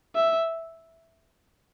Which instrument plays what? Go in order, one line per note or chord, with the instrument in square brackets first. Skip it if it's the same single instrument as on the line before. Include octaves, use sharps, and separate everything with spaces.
[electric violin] E5